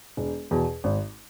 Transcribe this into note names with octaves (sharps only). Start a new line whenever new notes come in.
E1
E2 B2
G#1